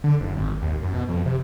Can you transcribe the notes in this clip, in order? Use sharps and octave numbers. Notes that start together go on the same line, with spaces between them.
D3
F#1
G#1
D#2
F#2
B2
F2
C3